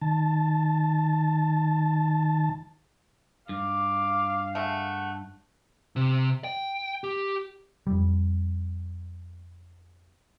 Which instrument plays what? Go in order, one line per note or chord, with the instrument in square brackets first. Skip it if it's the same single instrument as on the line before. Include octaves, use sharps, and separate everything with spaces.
[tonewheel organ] D#3 A5
[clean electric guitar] G2 [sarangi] F5 [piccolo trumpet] D6
[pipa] G#3 A3 [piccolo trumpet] F#5
[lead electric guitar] C3
G5
G4
[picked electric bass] F2 G3